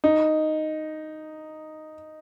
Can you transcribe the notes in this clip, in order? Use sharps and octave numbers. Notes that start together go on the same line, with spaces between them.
D#4